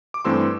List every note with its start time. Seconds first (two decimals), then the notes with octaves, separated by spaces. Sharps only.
0.14 D6
0.25 G2 E3 A3 C4 C6 E6